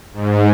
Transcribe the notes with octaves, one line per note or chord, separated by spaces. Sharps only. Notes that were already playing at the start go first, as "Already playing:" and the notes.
G#2